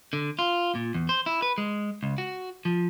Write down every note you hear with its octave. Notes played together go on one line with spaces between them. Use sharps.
D3
F4
A#2
E2
C5
E4
B4
G#3
C#2
F#4
F3